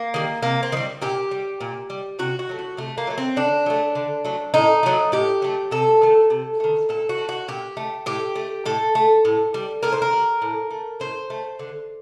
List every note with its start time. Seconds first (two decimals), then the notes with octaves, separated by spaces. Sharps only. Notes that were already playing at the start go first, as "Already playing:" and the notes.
Already playing: A#3
0.14 D#3 G3
0.43 C3 A#3
0.63 C4
0.72 D#3
0.77 G3
1.02 A#2 G4
1.31 G3
1.61 A#2
1.90 G3
2.19 C3 F#4
2.39 F#4
2.49 F#3 A3
2.59 F#4
2.77 C3 A3
2.98 A#3
3.07 F#3 A3
3.18 C4
3.36 D3 D4
3.66 F#3 A3
3.95 D3
4.24 F#3 A3
4.54 A2 D#4
4.83 F#3 A3
5.12 A2 G4
5.42 F#3 A3
5.71 C3 A4
6.02 D#3 A3
6.30 C3
6.60 D#3 A3
6.89 A#2 A4
7.09 F#4
7.18 A3
7.29 F#4
7.48 A#2 G4
7.77 A3
8.06 A2 G4
8.36 A3
8.66 A2 A4
8.95 A3
9.25 A2
9.54 G3
9.83 A2 A#4
9.92 C5
10.02 A#4
10.13 G3
10.42 A2
10.71 A3
11.00 A2 C5
11.30 A3
11.59 D3